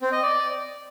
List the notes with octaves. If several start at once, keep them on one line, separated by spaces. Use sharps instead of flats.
C4
D#5
D5